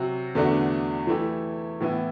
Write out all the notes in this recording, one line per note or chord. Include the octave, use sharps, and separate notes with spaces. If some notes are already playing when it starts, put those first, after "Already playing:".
Already playing: C3 F#3 C4 F#4
E2 D3 A3 D4 F#4
E3 A3 E4 G4
A2 E3 B3 E4